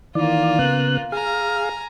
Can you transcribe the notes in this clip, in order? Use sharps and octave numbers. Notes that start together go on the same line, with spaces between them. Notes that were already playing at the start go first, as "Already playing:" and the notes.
D#3 E3 A#3 F4 D5
C#3 B3 F#6
G#4 F5 G#5 A#5